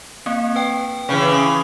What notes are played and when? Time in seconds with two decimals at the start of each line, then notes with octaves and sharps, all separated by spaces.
0.26 A#3 C4
0.56 B4 G5
1.09 C#3 E3 G#4
1.32 C#6 D#6